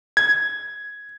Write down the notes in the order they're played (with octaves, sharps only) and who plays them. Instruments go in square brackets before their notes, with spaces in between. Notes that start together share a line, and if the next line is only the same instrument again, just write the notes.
[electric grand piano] G#6